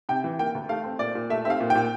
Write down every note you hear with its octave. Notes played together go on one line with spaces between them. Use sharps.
C3 G5
E3
A#3 G5
D2
A3 F5
C4
A#2 D5
A#2
A3 E5
C4 E5
F5
A#2
G5
A#2